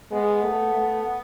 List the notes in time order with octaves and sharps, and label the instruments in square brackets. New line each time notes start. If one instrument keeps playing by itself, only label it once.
[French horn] G#3 [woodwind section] B3
[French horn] A3
A3